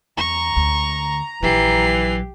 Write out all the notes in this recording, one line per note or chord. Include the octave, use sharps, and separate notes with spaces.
E2 A#5 C#6
D2
A#1 E3 F#3 G4 C7